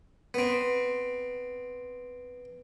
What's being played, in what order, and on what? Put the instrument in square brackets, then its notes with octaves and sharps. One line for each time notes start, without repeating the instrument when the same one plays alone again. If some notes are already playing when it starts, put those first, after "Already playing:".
[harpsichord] B3 C4